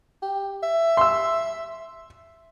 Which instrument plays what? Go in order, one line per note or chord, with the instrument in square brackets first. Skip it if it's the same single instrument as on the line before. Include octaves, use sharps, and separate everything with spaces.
[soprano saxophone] G4
E5
[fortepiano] C6 E6